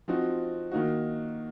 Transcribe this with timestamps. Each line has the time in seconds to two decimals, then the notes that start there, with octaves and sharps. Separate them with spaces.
0.08 F3 C4 D#4 F#4
0.72 D#3 A#3 D#4 F#4